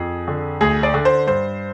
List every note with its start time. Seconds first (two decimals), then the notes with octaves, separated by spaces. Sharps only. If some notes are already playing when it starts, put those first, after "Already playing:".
Already playing: F2 F3 G#4
0.28 D3
0.61 D2 G#4
0.83 D5
0.94 D3
1.05 C5
1.27 G2 C5